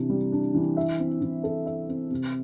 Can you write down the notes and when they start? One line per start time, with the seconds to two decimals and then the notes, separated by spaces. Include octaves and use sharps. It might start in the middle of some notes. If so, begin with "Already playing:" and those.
Already playing: C3 E3 D4
0.09 G3
0.32 D4
0.55 E3
0.77 E5
0.99 C4
1.21 E3
1.43 A4
1.66 E5
1.88 C4
2.11 C3